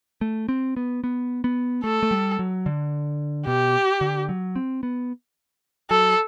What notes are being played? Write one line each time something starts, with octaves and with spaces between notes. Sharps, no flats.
A3
C4
B3
B3
B3
A3 A4
A3
G3
F#3
D3
B2 G4
D3
F#3
C4
B3
F#3 A4